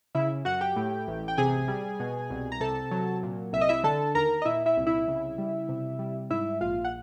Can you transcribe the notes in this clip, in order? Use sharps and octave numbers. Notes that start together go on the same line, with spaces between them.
C#3 E4 E5
F#2 F#4 F#5
G4 G5
A2
A1
G5
C3 G#4 G#5
G3
B2
C2
A#5
C3 A4 A5
F#3
A#2
C2 E5
D#5
E4 E5
D3 A4 A5
D#2 A#4 A#5
D#5
A#2 E4 E5
E4 E5
C2
E4 E5
C#3
G3
C3
G3
G#2 E4 E5
A#1 F4 F5
F#5